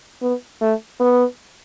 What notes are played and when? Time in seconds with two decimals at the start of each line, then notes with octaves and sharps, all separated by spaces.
0.22 B3
0.61 A3
1.00 B3